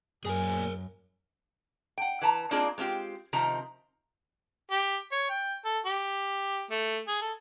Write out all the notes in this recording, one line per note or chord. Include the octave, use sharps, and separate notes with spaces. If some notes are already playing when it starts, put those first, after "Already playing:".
F#2 A#2 G#4 A#4 G#5
F#5 G5
E3 B4 A5 A#5
A#3 C4 D4 D#4 F4 G#4
G#3 C4 F4 G4
C3 D#3 F3 C4 A#5
G4
C#5
G5
A4
G4
A3
G#4
A4